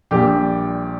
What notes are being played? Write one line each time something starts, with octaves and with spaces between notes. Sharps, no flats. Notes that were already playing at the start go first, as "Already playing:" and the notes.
A#1 A#2 G3 G4